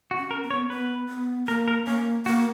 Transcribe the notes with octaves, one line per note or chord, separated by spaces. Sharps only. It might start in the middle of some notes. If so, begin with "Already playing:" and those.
F#4
C#4
A#4
B3
C#5
B3 B4
B3
A#3 A#4
A#4
A#3 C#4
A#3 F#4